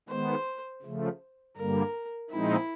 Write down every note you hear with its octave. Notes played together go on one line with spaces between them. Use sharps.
D#3 G#3 B3 C5
C#3 F3 A3
G2 D3 G3 A#3 A#4
A#2 F3 G#3 C4 D#4 E4